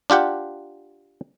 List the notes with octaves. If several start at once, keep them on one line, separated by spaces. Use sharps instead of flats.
D4 F4 G4 F#5